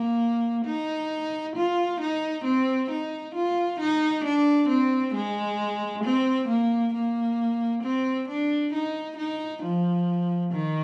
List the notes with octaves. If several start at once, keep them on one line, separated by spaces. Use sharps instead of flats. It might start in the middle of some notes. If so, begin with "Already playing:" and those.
Already playing: A#3
D#4
F4
D#4
C4
D#4
F4
D#4
D4
C4
G#3
C4
A#3
A#3
C4
D4
D#4
D#4
F3
D#3